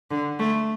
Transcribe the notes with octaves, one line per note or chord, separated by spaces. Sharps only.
D3
A3